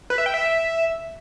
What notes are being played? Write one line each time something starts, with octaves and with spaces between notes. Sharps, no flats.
B4
E5
G5
E5